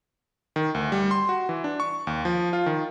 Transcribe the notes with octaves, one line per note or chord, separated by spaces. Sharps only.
D#3
D2
G3
C6
F#4
E3
D4
C#6
D#2
F3
F4
D#3